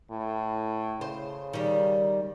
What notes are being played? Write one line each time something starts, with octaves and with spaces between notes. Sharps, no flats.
A2
C#3 C5
D#3 G3